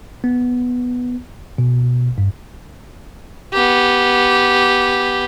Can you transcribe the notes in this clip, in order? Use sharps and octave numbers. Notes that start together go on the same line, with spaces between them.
B3
B2
G2
B3 G4